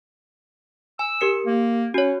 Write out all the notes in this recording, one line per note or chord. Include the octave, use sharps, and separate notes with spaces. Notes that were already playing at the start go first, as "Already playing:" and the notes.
G#5 E6
G4 A#4 C#7
A#3
C#4 F#4 C#5